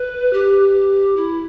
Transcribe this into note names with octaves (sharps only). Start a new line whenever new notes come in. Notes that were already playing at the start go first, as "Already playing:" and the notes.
Already playing: B4
G4
E4